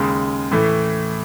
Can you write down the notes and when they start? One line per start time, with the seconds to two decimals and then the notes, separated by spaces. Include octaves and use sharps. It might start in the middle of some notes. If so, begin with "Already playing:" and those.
Already playing: D#2 C#3 G#3
0.52 A2 E3 A3